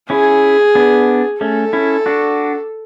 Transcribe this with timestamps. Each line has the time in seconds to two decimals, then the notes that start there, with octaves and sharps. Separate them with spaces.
0.10 C#4 E4 G#4
0.75 B3 D4
1.41 A3 C#4 A4
1.73 C#4 E4
2.06 D4 F#4